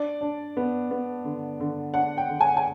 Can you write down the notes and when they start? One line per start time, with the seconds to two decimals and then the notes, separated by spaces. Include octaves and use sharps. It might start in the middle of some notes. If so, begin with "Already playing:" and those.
Already playing: D4 D5
0.21 D4
0.57 B3
0.91 B3
1.25 D3
1.60 D3
1.94 D4 F#5
2.18 G5
2.29 D3
2.41 G#5
2.57 G#5